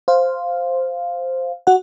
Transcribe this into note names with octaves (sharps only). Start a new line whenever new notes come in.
C5 F5
F#4 F#5